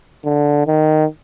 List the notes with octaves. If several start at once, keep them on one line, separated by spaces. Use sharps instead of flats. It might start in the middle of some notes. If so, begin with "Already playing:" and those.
D3
D#3